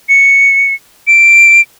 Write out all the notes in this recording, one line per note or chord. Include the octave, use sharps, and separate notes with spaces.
C#7
D7